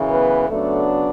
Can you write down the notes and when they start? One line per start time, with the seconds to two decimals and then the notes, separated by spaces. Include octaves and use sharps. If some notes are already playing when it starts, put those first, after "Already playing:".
Already playing: F#2 C#3 E3
0.09 B3 B4
0.49 C#3 F#3 A3 B3 D4 A4